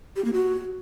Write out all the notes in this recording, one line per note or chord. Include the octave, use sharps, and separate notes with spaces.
G4
A#3
F#4